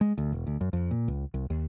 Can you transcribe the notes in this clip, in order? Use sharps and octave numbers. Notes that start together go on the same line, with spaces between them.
G#3
D2
E1
D2
F#2
F2
A#2
C#2
C2
D#2